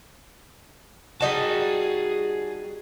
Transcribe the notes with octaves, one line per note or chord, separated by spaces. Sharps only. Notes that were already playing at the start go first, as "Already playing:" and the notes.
G3 D#4 F#4 G#4 A5